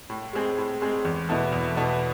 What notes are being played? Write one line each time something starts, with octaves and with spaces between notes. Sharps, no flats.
A2
G#3 C4 G#4
A2
G#3 C4 G#4
E2
B2 B3 E4 A4
E2
B2 B3 E4 A4